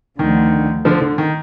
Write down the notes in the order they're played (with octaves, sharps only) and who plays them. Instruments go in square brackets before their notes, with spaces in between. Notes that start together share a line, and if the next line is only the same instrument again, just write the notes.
[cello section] D2 D3 F3 [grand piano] D#3
[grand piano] D3 F3
D3
D#3